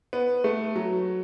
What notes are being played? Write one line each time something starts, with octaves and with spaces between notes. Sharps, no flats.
B3
A3
F#3